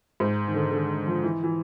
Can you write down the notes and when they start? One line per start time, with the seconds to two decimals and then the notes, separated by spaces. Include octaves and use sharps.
0.20 G#2
0.48 D#3
0.54 D3
0.72 D3
1.07 F3
1.24 E3
1.44 E3